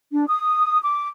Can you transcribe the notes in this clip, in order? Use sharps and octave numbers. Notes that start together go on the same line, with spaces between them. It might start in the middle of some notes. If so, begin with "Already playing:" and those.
D4
D#6
D6